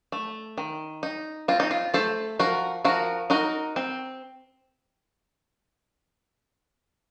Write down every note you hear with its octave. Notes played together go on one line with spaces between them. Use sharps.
A3
D#3
D#4
C4 F4
D#4
F4
A3 A4 C5
F3 F#4 A#4
F3 F#4 A#4
D#4 F#4 A#4
C4